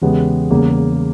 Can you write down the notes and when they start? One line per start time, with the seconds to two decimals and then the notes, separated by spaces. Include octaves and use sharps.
0.02 E2 C#3 G#3 B3 G4
0.51 E2 C#3 G3 A#3